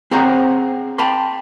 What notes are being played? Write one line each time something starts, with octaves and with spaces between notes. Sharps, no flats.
C4 G#4 C5 C#5 F#5 A#5
G5 A5 B5 C6